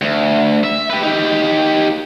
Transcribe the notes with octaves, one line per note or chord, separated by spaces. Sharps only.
D2
E5
G4 B4
D#4 G4